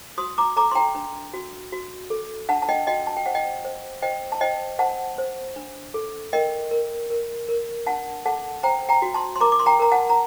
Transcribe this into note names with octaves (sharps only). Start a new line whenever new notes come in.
F#4 C6 D#6
A#5 D6
A4 A#5 D6
C6
G5 A#5
D4
F#4
F#4
A4
D4 F#5 A5
A5
D#5 G5
F#4 D#5 G5
A5
G5
C5 F#5
D#5 G5
C5
C5 D#5 G5
A5
C5 D#5 G5
C5 F#5 A5
C5
D4
A4
A#4 D#5 G5
A#4
A#4
A#4
D4 F#5 A5
A4 F#5 A5
C5 G5 A#5
G5 A#5
F#4
A5 C6
C6
A#4 A#5 D6
D6
C6
G5 A#5
A#4 A#5
F#5 A5
A#5